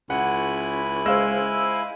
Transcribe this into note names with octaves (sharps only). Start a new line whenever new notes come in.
C#2 E4 F#5 G#5 B5
G#3 C5 F5 E6